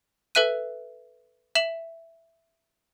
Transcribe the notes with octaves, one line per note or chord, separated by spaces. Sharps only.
A4 B4 E5 F#6 D#7
E5 E7 F#7